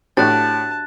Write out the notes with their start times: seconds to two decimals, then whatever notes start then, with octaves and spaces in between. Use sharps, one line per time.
0.17 A2 D4 F#4 G4 A5 F#6 A6